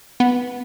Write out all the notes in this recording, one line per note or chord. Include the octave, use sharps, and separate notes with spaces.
B3